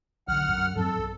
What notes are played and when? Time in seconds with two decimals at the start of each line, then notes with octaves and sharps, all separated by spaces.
0.28 B1 D3 F#5 F6
0.48 F#2
0.76 G2 F#3 C4 A4
0.98 B1